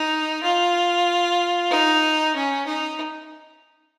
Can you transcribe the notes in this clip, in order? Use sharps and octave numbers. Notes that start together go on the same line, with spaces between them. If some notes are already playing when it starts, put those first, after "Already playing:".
Already playing: D#4
F4
D#4
C#4
D#4